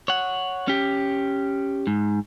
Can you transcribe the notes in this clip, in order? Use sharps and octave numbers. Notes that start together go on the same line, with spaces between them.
C#5 F#5
C#4 G4
G#2